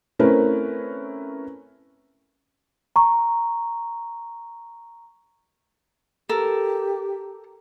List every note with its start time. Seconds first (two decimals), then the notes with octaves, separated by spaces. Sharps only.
0.19 A3 C4 C#4 E4 A#4 B4
2.96 A#5 C#6
6.29 G4 A4 A#4